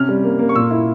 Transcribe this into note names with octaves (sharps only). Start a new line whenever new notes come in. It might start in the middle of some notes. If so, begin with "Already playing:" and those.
Already playing: C3 C#4 F6
G3
A#3
A#3
C#6
A#2 E6
E4